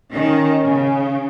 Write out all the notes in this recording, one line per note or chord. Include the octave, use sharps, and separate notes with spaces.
D#3 C#4
C#3